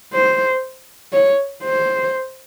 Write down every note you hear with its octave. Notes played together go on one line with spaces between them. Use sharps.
C5
C#5
C5